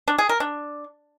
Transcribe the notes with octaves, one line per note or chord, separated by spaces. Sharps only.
D4
G#4
A#4
D4